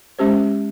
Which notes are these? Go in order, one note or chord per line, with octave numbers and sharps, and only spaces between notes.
G#3 C#4 G4 C5